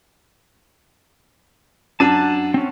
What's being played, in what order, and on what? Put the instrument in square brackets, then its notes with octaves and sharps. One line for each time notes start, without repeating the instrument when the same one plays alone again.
[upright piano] F#2 D4 D#7 [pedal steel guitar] F#5 A5
[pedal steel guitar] C4 C#4